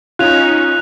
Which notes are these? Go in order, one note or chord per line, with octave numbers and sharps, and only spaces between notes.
C#4 D#4 F4 F#6 F7